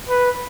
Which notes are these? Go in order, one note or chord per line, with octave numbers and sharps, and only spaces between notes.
B4